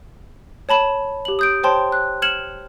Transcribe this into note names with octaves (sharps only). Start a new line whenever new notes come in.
C#5 A5 B5 E7
G4 F#7
D#6 G6 D7
C5 C#5 G5 A5 C6
F#6
F6 G#6 C#7 E7 F#7